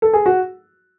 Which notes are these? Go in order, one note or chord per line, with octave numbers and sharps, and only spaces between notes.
A4
G#4
F#4